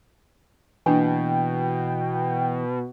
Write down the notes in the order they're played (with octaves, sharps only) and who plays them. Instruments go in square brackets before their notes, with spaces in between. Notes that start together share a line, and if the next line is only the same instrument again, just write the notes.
[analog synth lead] B2 [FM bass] E3 [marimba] A#3 D4 G#5 [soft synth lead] G5